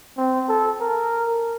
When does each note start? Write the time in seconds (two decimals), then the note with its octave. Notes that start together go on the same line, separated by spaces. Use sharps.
0.17 C4
0.49 A4
0.80 A#4